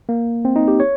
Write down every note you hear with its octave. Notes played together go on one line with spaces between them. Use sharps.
A#3
C4
D#4
G4
C#5